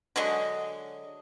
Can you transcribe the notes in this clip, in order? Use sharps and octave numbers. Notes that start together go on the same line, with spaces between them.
D3 F#3 G#3 D#5